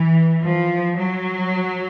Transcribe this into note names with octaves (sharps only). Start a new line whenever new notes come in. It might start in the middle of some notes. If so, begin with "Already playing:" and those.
Already playing: E3
F3
F#3